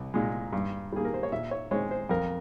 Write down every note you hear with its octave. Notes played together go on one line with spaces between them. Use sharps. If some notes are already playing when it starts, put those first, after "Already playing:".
Already playing: C2
A#2 G#3
G2
G3 A#3 G#4
A#4
C5
C#5
A#2 E5
C#5
G#3 C4 C#5
C5
F2 A#4